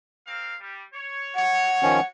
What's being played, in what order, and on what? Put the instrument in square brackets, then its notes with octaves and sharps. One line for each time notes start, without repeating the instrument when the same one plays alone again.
[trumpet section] A#3 C4 F5
G3
C#5
[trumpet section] C#5 [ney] F#5
[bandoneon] D#3 F3 C#4